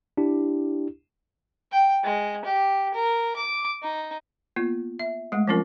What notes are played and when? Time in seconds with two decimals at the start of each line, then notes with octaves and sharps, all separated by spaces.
0.17 D4 E4 G4
1.72 G5
2.04 G#3
2.45 G4
2.94 A#4
3.36 D6
3.83 D#4
4.56 A#3 B3 F4
4.99 E5
5.32 G#3 A3 F#5
5.48 F3 F#3 C4 C#4 F4 A#4